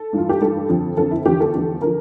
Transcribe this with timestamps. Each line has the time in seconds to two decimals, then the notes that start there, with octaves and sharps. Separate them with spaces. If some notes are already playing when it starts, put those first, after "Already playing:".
Already playing: A4
0.13 G2 E3 F4
0.29 G4
0.41 G2 E3 A4
0.69 F2 D3 F3
0.97 F2 D3 F3 A4
1.11 E4
1.25 E2 D3 F3 G4
1.40 A4
1.54 E2 D3 F3
1.81 D3 F3 A#4